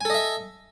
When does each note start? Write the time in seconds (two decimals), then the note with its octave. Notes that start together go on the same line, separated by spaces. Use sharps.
0.01 G#5
0.05 A4
0.10 D#5
0.14 E5